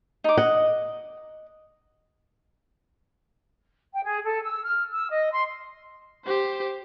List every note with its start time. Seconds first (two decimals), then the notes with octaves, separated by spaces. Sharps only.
0.24 D#4 D6
0.37 D#5 F#5
3.93 G5
4.05 G#4
4.25 A4
4.44 E6
4.64 F6
4.90 E6
5.11 D#5
5.32 C6
6.26 G4 C5